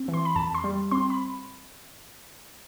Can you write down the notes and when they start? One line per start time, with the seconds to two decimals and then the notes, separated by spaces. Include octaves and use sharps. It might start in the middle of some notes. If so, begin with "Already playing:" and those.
Already playing: C4
0.08 E3
0.14 C6
0.25 B5
0.36 F2 A5
0.55 C6
0.64 G3
0.91 C4 C6
1.10 B5